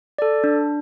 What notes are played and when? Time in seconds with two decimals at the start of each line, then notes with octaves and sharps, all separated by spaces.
0.18 A4 D5
0.44 D4